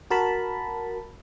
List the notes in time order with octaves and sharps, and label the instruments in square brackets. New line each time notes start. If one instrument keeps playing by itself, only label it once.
[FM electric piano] F#4 A#4 A5 B5